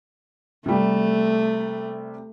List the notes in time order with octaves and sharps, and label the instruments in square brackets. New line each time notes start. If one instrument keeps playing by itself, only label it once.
[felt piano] C3 G3 [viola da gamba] A3